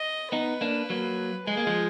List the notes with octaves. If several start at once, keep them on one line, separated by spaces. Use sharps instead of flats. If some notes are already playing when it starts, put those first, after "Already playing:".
Already playing: D#5
B3 D#4 B4
A#3 D4
F#3 A#3
G#3 G#4
A#3
F3 G#3